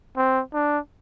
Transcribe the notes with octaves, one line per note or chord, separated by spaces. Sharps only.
C4
D4